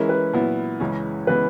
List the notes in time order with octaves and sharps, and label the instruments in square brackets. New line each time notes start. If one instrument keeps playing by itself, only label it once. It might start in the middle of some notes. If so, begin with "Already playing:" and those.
Already playing: [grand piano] E3 G#3 C#4 E4 [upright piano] A#4
[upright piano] B4
[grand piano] A#2 F#3 B3 E4
C#2 C#3 E3 G#3 C#4
[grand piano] C#3 E3 G#3 B3 [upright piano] B4